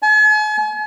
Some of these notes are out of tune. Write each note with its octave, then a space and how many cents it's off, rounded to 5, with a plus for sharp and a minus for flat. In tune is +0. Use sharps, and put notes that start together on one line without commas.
G#5 +45